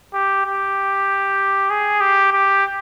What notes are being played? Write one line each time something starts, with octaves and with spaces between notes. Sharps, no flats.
G4
G4
G#4
G4
G4